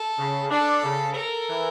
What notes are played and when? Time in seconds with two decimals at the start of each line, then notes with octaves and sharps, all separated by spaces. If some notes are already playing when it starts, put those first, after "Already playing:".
Already playing: A4
0.18 C#3
0.51 D4 A4
0.83 C#3
1.16 A4 A#4
1.48 E3